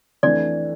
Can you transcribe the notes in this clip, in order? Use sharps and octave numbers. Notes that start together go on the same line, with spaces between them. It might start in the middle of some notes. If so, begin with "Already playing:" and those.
F2 E3 A3 D4 D5